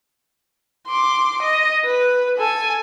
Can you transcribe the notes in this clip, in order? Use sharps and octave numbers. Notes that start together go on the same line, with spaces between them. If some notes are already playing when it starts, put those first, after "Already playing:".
C6 D6
D#5
B4
A4 G#5